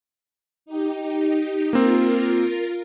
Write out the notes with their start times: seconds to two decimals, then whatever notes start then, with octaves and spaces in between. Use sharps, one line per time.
0.66 D#4 G4
1.73 A#3 C4 F4 A#4